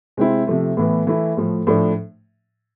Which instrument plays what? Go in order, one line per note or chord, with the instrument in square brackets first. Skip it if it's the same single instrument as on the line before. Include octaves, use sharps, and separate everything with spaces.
[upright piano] C3 G#3 C4 E4
C3 F3 A3
A2 E3 B3
E3 A3 E4
A2 F3 A3
A2 F3 A3 D4